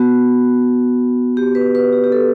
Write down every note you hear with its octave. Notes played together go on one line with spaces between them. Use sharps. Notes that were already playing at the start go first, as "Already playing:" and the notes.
Already playing: B3 F#4
G4
B4
B4
G4
G4
A4